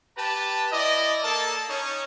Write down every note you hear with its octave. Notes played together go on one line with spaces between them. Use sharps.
G4 B4 A5
E4 D5 D#5
A#3 A4 A#4 A5
C#4 D#4 C#5